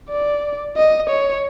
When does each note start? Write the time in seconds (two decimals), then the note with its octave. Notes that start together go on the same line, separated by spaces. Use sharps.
0.10 D5
0.77 D#5
1.10 C#5